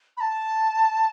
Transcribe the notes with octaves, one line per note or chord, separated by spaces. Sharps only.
B5
A5